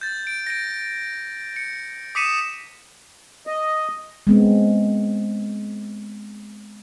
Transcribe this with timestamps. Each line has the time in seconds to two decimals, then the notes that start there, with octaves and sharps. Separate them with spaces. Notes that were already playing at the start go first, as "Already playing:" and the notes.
0.01 G6 A6
0.27 D7
0.47 A#6 D7
1.56 C#7
2.15 D6 D#6 B6 C#7 D#7 E7
3.47 D#5
4.27 G#3 B3 C4